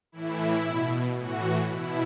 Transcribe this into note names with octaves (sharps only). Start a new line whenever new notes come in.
A2 E3 E4
B2
A2 E3 F#4
B2 E4